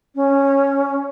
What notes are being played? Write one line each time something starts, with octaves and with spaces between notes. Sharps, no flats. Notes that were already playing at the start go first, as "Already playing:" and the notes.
C#4